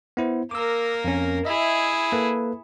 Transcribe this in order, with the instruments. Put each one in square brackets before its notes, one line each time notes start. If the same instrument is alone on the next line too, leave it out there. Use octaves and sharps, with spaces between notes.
[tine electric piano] B3 E4 C5
[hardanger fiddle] A#3 A#4 [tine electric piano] D6 E6
[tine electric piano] F2 C#4
[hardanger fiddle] E4 G#4 [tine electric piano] D#5 E5
[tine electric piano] A#3 A4 B4